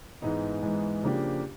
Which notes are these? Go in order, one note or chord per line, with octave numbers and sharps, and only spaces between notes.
G#2 E3 G#3 B3 D#4
G#2 E3 G#3 B3 D#4
C#3 F3 A#3 D4 G4